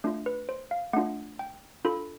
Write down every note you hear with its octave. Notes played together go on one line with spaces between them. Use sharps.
A3 D4 F4
B4
C5
F5
A3 D4 F4 F#5
G5
D4 F4 A4 B5